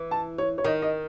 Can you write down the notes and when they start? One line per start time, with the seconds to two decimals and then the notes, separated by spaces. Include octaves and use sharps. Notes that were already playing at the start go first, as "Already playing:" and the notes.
Already playing: E3
0.11 A5
0.38 C#5
0.58 C#5
0.65 D#3 D#5
0.82 D#5